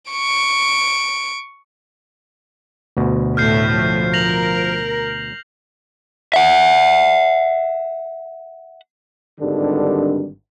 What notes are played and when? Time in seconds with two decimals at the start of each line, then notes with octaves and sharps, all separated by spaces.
0.11 C#6 D7
2.97 D2 B2
3.37 A2 A3 F6 G6 C7
3.73 F3
4.13 A#4 A#6 F7 F#7
6.34 E5 F#5
9.39 G#1 G2 D3 D#3 G3 D4